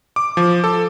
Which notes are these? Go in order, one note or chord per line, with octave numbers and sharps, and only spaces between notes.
D6
F3
A4